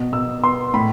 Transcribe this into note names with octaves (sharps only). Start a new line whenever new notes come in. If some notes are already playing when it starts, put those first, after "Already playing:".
Already playing: B2
B2 E6
B3 C6
A2 B5